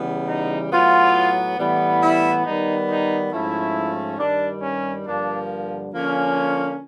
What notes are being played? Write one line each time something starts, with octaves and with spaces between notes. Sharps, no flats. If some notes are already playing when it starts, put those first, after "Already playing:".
Already playing: C#3 E3 G3 B3
D#4
A2 F#3 B3 F4
A2 E3 G3 B3
E4
D#3 G3 B3 D#4
D#4
G#2 F3 A3 C#4 E4
G2 D#3 G3 D4
C#4
G2 D3 F3 A#3 D4
D3 F3 A#3 C#4